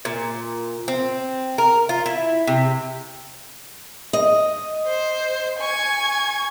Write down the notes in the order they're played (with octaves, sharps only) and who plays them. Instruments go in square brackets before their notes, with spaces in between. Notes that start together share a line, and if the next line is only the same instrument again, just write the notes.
[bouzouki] A#2
C4
A#4
F4
E4
C3
[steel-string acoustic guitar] D#5
[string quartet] C5
G#5 C#6 G#6